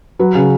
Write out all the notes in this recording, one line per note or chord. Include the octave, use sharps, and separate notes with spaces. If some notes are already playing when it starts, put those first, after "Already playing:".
F#3 B4
C#3